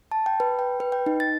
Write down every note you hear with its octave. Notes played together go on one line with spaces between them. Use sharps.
A5
G5
B4
G5
B4
G5
D#4
A6